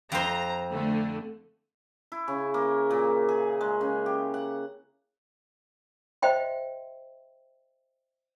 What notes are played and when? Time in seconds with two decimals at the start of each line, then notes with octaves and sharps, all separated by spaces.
0.12 F2 C5 A#5
0.72 D3 A3
2.12 E4
2.28 C#3
2.54 A#3
2.91 A#2
3.29 G#4
3.61 G#3
3.81 C#3
4.06 G4
4.34 F#5
6.22 C5 D#5 E5 G5 C6